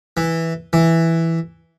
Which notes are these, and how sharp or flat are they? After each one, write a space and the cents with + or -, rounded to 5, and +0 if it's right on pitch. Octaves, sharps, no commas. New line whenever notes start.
E3 -5
E3 +0